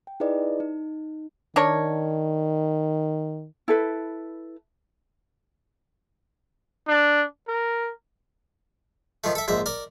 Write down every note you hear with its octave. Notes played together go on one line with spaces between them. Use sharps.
G5
D#4 E4 G#4 B4 D5 D#5
D#4
D#3 D4 A#4 C#5
E4 A4 B4
D4
A#4
D#3 F3 A3
A4 E5
A#1 G#2 E5
A#4 D5